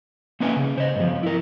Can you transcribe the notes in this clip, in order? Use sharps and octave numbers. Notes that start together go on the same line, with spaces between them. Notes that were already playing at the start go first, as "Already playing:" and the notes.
A#3 C#4 B4 D#5 E5 G#5
C#3
C5 D#5
G2 F3
E4 A#4